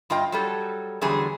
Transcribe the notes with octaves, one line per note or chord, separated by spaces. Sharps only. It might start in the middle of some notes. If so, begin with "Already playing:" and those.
G2 F4 D#5 G5
F#3 G3 A4
E2 D3 F#3 G3 G#4